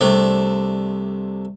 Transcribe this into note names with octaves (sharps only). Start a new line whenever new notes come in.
C2 C3 A3 D4